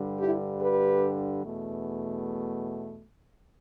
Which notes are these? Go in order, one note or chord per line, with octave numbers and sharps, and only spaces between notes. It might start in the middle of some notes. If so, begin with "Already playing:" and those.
Already playing: G2 D3 G3
E4 G4
G4 B4
E2 B2 A3